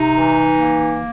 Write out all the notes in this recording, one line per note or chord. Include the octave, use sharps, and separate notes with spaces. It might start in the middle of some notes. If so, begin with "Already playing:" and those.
Already playing: C3 D#4
E3
A#3